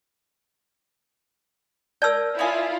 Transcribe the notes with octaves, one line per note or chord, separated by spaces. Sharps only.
A#4 D5 A5 E6 G6
E4 F4 C#5 D#5 G#5